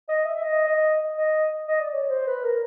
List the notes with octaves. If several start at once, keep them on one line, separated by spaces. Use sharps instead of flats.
D#5
E5
E5
D#5
D#5
D#5
D#5
D5
C#5
C5
B4
A#4